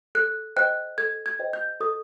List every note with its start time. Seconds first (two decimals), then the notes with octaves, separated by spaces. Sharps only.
0.15 A4 F#6
0.56 C5 D#5 G5 F#6
0.98 A4 G#6
1.26 G#6
1.39 C5 D#5 G5
1.53 G6
1.80 A4 D#6